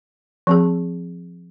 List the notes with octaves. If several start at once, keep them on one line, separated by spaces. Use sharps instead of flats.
F3 C4 G#4